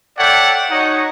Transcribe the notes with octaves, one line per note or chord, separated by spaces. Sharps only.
A4 C#5 D5 E5 F#5 G5
D#4 F#4 C#5 D#5 F#5 A#5